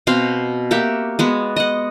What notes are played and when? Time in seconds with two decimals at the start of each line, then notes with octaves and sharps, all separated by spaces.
0.07 B2 C4 F5
0.71 A#3 F#4 G4 E5
1.19 G#3 B3 F#4
1.56 D#5 F#5